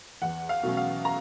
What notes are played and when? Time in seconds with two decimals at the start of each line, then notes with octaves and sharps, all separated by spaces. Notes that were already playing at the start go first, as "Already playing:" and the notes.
0.22 E2 F#5
0.49 F5
0.63 B2 F#3 A3 C#4
0.77 F5
1.05 A#5